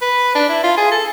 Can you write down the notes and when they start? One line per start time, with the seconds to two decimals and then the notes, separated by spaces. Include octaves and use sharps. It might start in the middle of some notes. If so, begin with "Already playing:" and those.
0.02 B4
0.35 D4
0.49 E4
0.63 F4
0.77 G#4
0.91 A4